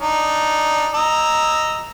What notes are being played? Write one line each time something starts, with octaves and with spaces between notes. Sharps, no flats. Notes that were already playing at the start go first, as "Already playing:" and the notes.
D4 D#4
D#5 A#5 E6